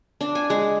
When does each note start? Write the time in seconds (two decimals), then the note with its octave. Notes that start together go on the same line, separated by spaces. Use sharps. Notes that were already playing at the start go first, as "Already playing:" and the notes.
0.21 D4
0.35 G#5
0.50 G#3